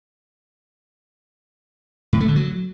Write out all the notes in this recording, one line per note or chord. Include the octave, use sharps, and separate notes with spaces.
A2
A3
D3
F#3